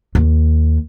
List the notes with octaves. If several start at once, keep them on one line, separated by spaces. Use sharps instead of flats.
D#2